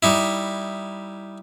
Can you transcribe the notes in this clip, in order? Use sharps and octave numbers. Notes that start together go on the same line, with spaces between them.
G3 D#4 E4